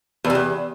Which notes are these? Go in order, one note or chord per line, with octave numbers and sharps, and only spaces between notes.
E2
C3
E2